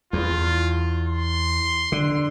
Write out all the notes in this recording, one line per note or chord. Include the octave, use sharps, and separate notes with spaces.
E2 F4
C6
D3